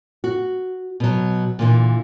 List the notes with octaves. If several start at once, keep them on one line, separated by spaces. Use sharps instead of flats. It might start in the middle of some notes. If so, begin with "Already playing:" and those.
F#4
B2 F#3
A#2 D3 E3